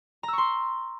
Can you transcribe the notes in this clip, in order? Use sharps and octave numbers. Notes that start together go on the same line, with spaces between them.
A#5 C6 C#6 E6